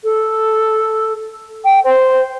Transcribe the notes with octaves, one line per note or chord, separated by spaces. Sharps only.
A4
G5
C5